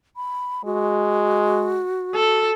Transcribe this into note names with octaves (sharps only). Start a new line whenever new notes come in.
B5
G#3 F#4
A4